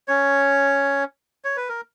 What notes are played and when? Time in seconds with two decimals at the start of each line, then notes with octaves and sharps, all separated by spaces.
0.08 C#4 C#5
1.45 C#5
1.57 B4
1.69 A#4